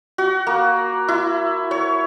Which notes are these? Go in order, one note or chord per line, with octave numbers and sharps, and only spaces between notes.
F#4
A#3
E4
C#5